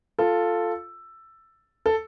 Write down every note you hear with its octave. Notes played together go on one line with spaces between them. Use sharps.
F4 A4
A4